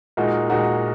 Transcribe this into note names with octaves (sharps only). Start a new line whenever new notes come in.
A#2 G#3 D#4 F#4 A#4
A#2 G#3 D#4 F#4 A#4